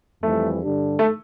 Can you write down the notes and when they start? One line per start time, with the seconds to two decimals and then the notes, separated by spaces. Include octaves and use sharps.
0.23 F2 E3 G3 A3
0.61 G2 D3 G3 D4 G4
0.99 A3